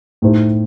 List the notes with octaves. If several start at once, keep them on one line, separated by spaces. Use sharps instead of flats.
A2 A3 D#4 G4 C5